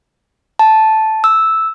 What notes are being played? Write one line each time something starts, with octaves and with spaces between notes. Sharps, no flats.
A5
E6